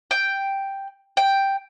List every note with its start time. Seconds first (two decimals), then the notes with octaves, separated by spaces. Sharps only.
0.11 G5
1.17 G5